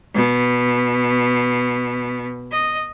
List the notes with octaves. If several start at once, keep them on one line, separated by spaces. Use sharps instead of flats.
B2
D#5